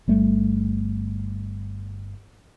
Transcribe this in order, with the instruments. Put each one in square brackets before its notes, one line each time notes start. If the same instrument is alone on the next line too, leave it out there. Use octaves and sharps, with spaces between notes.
[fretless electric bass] G1 G3 A3